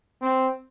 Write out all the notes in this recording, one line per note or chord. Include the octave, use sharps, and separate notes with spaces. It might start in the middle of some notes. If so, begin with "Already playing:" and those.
C4